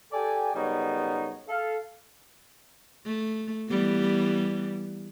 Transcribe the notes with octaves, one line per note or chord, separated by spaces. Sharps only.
G4 A4 D5 G5 G#5
F#2 C#3 G3 B3 D#4 C#5
A4 F5
A3
E3 G3 B3